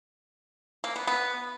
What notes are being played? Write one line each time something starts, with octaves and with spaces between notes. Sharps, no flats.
A#3
B3
B3